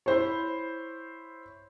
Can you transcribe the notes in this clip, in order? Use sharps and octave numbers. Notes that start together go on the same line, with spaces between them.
E4 C5 C#5